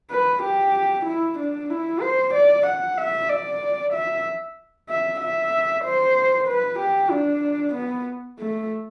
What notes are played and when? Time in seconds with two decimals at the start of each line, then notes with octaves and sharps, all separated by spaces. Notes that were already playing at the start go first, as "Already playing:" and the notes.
0.11 B4
0.43 G4
1.06 E4
1.39 D4
1.70 E4
2.02 C5
2.34 D5
2.67 F#5
2.98 E5
3.30 D5
3.94 E5
4.89 E5
5.20 E5
5.84 C5
6.48 B4
6.79 G4
7.11 D4
7.75 B3
8.39 A3